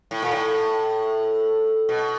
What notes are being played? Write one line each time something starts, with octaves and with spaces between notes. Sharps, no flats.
A2
A#2
A2
B2